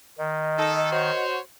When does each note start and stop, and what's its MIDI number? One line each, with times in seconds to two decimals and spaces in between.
0.18 1.11 51
0.18 1.26 75
0.58 0.89 63
0.58 0.89 69
0.92 1.39 66
0.92 1.39 72
0.92 1.39 73